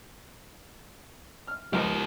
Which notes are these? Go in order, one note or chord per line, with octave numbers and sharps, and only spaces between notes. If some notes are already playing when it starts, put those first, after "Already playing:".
F6
C#2 F3 G4 A#4